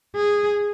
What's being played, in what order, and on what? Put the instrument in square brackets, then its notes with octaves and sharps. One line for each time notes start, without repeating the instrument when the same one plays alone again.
[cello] G#4